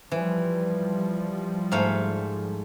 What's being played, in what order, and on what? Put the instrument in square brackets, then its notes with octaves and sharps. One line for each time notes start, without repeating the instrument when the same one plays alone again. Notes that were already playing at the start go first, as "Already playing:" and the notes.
[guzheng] E3 [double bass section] F3 G3
[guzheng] G#2 A3 F5